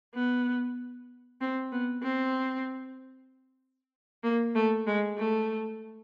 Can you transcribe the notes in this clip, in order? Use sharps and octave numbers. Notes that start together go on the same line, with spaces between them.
B3
C4
B3
C4
A#3
A3
G#3
A3